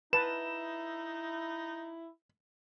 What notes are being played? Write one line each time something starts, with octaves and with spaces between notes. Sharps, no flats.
D#4 E4 B4 A5 E7